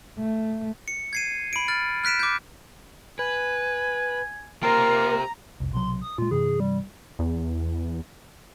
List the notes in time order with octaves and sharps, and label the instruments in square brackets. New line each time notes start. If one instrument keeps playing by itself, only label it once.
[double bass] A3
[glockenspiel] C#7
G#6 C7 D#7
B5 D7
F6 A6
F6 F#6 B6 D7 E7
D6 G6
[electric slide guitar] B4 [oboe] G#5
[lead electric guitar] A#3 [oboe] F4 [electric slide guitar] G4 C5 G5 [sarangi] A#5
[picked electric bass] F1 C2
[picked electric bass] B1 C3 F#3 [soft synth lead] C6
[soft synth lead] D#6
[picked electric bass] A#2 G#3 [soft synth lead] F4
[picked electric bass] G2 C3 E3 [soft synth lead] G#4
[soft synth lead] G3
[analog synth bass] E2